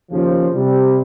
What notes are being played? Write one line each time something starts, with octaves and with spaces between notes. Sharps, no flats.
D#2 C#3 F3
C3 G3